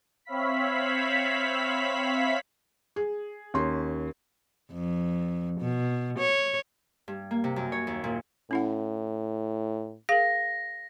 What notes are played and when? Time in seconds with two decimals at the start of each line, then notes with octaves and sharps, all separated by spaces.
0.25 C4 C#5 E5 F5 B5 B6
2.96 G#4
3.54 D#2 C#4 C6
4.72 F2
5.60 B2
6.18 C#5
7.08 G2
7.31 A#3
7.44 C3
7.56 F#2
7.72 C#5
7.87 D#2
8.04 A#2
8.51 A2 C#4 E4 F#5
10.09 G#4 A#4 F5 A#6